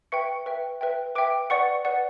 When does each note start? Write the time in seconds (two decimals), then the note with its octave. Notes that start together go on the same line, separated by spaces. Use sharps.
0.12 B4 E5 G5 C#6 C#7
0.46 B4 E5 G5
0.81 B4 E5 G5
1.15 B4 E5 G5 D6 D7
1.50 B4 D5 F#5 C#6 C#7
1.85 B4 D5 F#5